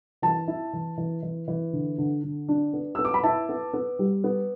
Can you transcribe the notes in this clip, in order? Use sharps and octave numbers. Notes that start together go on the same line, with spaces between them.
E3 A5
E4
E3
E3
E3
E3
D3
D3
D3
D4
B3
B3 E6
D6
B5
E4 A5
B3
B3
G3
B3